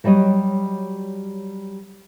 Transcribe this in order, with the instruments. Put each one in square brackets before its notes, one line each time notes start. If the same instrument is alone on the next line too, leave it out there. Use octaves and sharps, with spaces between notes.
[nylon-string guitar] F#3 G3 F#4 C#5 D#5